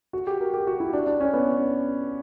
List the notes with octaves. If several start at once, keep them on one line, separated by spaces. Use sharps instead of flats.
F#4
G4
A#4
G4
F#4
E4
D4
D4
C#4
B3